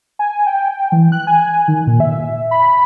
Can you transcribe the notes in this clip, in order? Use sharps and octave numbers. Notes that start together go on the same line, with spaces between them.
G#5
G5
E3
F#6
G#5
D#3
A#2
E5
B5